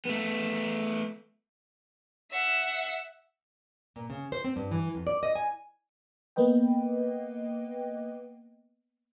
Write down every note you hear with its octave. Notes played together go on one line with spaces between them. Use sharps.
A3 B3
E5 F#5
A#2
C#3
C5
C4
G2
E3
F2
D5
D#5
G#5
A#3 B3 B4 D#5 G5